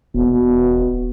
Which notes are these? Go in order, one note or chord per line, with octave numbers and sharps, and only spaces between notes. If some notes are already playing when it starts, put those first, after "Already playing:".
D#1 B2